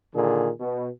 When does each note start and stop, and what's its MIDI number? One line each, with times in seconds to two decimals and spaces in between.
0.14 0.49 46
0.14 0.49 50
0.14 0.49 51
0.14 0.49 68
0.60 0.87 47